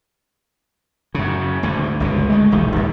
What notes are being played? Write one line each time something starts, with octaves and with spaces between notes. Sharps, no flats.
F#2 C#3
D2 G#2 D3
G1 C#2 B2
G#3 A3
D#1 B1 D#3 E3
D#2 D3 D#3